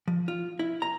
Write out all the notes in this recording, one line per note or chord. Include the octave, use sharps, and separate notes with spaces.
F3
F4
E4
A#5